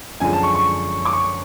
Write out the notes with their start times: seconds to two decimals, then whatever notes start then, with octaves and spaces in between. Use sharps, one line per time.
0.20 F#2 D3 F3 G#3 G#5
0.33 A5
0.43 C#6
0.55 C#6
1.05 D6
1.13 C#6